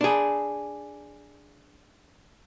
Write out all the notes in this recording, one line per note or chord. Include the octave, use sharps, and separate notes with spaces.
D4 G#4